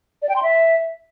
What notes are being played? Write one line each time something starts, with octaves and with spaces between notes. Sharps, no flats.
D5
G5
C6
E5